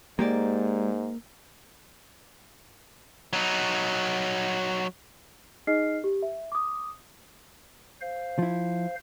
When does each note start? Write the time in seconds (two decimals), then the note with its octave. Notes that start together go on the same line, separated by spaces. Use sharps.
0.19 G#2 G#3 A#3 G4 D5
3.33 F#3 D#4
5.67 D#4 G#4 D#5 F6 C7
6.04 G4
6.23 E5
6.52 D6 D#6
8.01 C5 F5
8.39 F3 E4